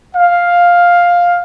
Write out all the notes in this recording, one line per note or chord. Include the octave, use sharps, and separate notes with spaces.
F5